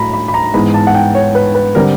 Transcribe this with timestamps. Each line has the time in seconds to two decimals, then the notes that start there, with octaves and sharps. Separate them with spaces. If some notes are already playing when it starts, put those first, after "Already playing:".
Already playing: A2 F#3 A3 A#5 B5
0.14 B5
0.28 B5
0.34 A#5
0.54 G#2 E3 G#3 B3 D#4 B5
0.74 A5
0.87 F#5
0.94 G5
1.15 C#5
1.35 B4
1.55 B4
1.75 D3 G3 C4 A#4